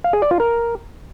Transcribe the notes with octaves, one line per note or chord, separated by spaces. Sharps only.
F5
G#4
D5
F4
A#4